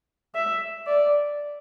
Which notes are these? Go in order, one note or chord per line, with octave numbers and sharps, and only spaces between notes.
E5
D5